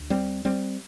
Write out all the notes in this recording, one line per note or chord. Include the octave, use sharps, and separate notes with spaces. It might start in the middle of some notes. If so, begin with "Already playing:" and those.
Already playing: D2
G3 C4
G3 C4